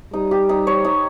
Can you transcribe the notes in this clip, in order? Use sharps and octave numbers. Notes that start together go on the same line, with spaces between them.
G3 D#4
G4
D#4
C#5
D#4